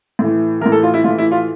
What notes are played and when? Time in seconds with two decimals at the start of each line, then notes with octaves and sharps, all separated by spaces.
0.19 A2 E3
0.61 E3 A#4
0.66 A2
0.72 A4
0.83 F4
0.94 E4
1.04 A2 E3 F4
1.18 E4
1.31 F4